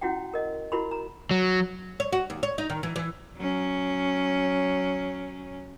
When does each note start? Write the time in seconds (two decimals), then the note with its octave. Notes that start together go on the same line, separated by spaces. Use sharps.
0.01 C#4 E4 F#4 F#5 G5
0.34 A#4 D#5
0.72 E4 F#4 A#4 B5 C6
0.91 A#5
1.31 F#3
2.00 C#5
2.13 F#4
2.30 D#2
2.43 C#5
2.58 D#4
2.70 D#3
2.83 E3
2.96 E3
3.37 F#3 C#4